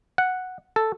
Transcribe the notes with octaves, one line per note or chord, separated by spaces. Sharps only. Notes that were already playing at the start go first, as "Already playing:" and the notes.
F#5
A4